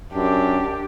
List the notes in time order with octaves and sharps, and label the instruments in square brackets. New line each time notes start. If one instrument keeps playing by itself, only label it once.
[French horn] F#2 [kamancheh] D4 [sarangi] G4